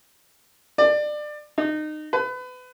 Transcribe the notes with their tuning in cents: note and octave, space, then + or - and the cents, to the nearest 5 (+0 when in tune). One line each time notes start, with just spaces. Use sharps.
D5 +25
D#4 -25
B4 +30